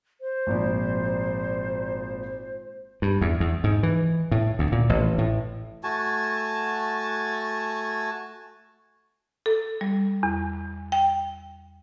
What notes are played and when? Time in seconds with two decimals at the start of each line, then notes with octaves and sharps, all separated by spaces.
0.21 C5
0.47 G#1 A#2 F3
3.02 G2
3.21 E2
3.40 E2
3.64 G#2
3.83 E3
4.31 A2
4.59 D2
4.72 A#2
4.89 A1
5.18 A2
5.83 A3 F#4 G#5 A5
9.46 A4
9.81 G3
10.23 E2
10.92 G5